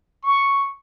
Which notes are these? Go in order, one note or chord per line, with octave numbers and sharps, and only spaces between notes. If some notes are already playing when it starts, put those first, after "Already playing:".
C#6